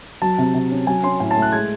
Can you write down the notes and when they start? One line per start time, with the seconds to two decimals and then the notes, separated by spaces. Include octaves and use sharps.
0.22 F#3 A5
0.38 C3
0.54 C3
0.71 C#4
0.87 F#3 G#5
1.04 C#4 C6
1.20 A2 G#5
1.31 A5
1.37 A3
1.42 F#6
1.52 G#3 G#6